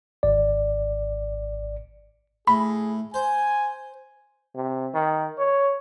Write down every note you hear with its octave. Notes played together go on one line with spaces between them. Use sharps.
G#1 D5
A2 G#4 B5
C5 G#5
C3
D#3
C#5